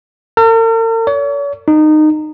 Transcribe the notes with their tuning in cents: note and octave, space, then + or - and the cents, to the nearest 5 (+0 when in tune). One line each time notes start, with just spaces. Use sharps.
A#4 -45
C#5 +40
D#4 -20